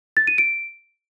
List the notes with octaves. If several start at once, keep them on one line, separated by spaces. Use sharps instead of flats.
A6
D#7
D7